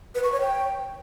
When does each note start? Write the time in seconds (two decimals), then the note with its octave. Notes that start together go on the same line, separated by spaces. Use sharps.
0.15 B4
0.24 C#6
0.32 C#5
0.41 G5